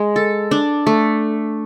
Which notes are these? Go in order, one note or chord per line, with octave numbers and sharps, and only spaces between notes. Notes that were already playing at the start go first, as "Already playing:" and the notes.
Already playing: G#3
A4
D4
A3